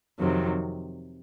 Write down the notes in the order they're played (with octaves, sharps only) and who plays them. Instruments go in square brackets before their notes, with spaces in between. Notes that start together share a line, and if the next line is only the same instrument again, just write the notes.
[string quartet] F2 C3 D#3 F#3